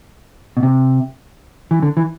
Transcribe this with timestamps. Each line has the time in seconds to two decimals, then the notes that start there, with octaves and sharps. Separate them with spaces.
0.57 B2
0.63 C3
1.71 E3
1.82 D3
1.97 E3